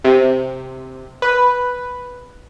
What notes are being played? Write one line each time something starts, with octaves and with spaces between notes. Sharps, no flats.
C3
B4